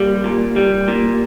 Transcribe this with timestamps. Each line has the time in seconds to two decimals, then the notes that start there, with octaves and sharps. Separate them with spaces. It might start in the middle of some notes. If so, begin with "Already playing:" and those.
Already playing: G3 A#3
0.24 A#2
0.56 G3
0.88 A#2